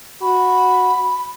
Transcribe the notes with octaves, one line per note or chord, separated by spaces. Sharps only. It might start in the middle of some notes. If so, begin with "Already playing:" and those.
F#4 B5